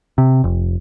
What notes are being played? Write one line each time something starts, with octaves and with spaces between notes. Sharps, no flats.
C3
F1